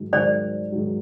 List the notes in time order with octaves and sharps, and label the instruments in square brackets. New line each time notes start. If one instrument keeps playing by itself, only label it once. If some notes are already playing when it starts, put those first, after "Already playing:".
Already playing: [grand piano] G#2 D#3 F#3
[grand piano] G#2 D#3 F#3 [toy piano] C5 D5
[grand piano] G#2 D#3 F#3